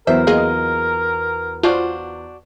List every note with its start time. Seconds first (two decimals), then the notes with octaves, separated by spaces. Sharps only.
0.07 E2 F#3 B3 A#4 C5 E5
0.27 A#3 F4 G#4 D#5
1.63 D4 F4 F#4 C5